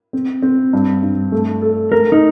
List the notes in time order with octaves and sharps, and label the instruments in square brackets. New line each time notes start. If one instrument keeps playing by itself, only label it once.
[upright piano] C4
C4
G2
G2
A3
A4
[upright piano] A3 [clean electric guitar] A#4
[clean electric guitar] D#4